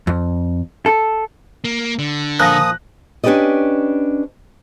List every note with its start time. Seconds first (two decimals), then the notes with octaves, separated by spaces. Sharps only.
0.07 F2
0.86 A4
1.64 A#3
1.99 D3
2.40 A#2 F3 D#6 F#6 A#6
3.24 C#4 D4 G4 B4 D5 D#5